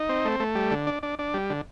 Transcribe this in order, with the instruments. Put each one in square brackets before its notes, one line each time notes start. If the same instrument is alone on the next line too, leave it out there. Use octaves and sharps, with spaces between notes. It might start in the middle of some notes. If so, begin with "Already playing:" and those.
Already playing: [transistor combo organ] D#4
C4
A3
A3
G3
D3
D4
D4
D4
G3
D3